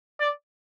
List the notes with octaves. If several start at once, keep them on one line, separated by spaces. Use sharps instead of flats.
D5